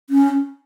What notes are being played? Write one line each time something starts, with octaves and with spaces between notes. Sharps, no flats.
C#4